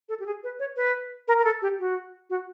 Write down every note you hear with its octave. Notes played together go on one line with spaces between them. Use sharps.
A4
G4
G#4
B4
C#5
B4
A#4
A#4
A4
G4
F#4
F#4